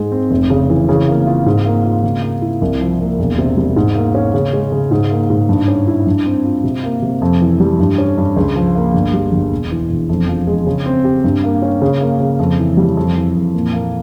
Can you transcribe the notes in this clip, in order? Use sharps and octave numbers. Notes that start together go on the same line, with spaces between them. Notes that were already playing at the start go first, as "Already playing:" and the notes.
Already playing: G#2 G#3
C4
F1
C#3
E3
C#3
A#3
F4
G#2
A#3
F4
C#3
A#3
E4
C2
F3
A#3
E1
C3
G3
G#2
A#3
C#4
C#3
G#3
C#3
G#2
A#3
G#2
G2
C#4
E4
G2
C4
F4
C3
A#3
C3
F2
E3
G3
G2
C#4
G2
C#2
F3
A#3
G1
G3
G1
E1
E3
E1
F2
F3
G#3
C#3
C4
G4
G2
A#3
C#4
C#3
A#3
C#3
F2
E3
G3
F2
E3
F2
A#2
A#3